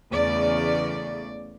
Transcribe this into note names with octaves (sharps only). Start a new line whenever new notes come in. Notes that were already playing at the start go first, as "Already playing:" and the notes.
E2 C#3 A3 D5